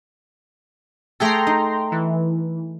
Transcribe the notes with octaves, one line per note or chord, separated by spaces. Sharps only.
A3 G#4 A4 G5 A#5 C6
D#4
E3